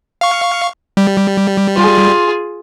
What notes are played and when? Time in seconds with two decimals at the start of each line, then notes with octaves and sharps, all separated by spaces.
0.21 F5 C#6
0.97 G3
1.76 F4 G#4